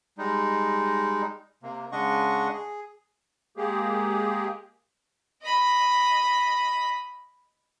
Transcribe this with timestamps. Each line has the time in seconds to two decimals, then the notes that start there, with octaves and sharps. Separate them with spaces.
0.18 G3 G#3 D#4
1.63 C3 A#3
1.92 C#3 G#3 D4 D#5 F#5 C#6
2.53 G#4
3.57 G#3 A#3 G4 G#4
5.43 D#5 B5